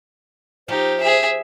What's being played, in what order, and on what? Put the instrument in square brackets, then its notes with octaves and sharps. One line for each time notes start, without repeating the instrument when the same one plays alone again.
[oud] F3 [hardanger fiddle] D#4 G4 [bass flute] C5
[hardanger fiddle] G#4 E5